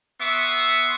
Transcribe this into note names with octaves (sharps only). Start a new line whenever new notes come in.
B3 E5 C6 C#6